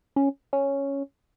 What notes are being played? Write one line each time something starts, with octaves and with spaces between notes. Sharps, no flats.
C#4
C#4